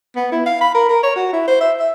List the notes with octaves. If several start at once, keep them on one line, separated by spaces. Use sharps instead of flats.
B3
E4
F5
B5
A#4
A#4
C#5
F#4
E4
C5
E5
E5